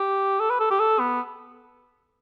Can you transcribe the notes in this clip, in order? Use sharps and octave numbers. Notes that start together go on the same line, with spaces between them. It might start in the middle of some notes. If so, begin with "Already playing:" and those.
Already playing: G4
A4
B4
A4
G4
A4
B3